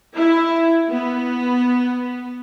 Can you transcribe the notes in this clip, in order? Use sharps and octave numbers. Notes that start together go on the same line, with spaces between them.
E4
B3